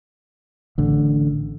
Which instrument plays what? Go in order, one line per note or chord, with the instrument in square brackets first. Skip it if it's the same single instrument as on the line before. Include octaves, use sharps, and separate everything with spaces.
[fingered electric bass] A1 D3